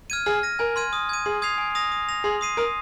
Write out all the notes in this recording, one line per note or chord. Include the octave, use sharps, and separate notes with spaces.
F6 G#6 D#7
G#4 F6
A#6 D#7
A#4 G#5
C6 F6 G#6 D#7
D#6
G#6 D#7
G#4 C6
D#6 G#6 C7 F7
G#5
D#6 A#6 F7
D#6
A#6 F7
G#4 C6
D#6 C7 D#7
A#4 D#6